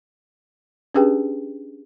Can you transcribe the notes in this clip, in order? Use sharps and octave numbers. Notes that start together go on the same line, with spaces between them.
C#4 D4 G4 G#4 B4 G5